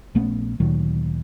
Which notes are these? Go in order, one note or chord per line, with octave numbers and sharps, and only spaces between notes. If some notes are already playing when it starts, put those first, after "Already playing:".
A#1 A3 B3 C#4
D2 A#2 D#3 F#3